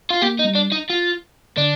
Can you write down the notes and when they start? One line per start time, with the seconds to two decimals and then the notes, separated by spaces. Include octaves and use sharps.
0.11 F4
0.22 A#3 G4
0.40 D#4
0.45 G3
0.55 D4
0.72 D#4
0.90 F4
1.57 D3 D4